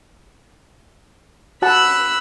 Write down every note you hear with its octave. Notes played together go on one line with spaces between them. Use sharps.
F#4 F#5 A5 B5 E6 F#6